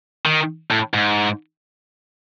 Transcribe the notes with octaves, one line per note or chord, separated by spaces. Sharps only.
D#3
A2
G#2